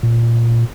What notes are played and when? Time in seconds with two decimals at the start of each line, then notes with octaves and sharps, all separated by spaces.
0.03 A#2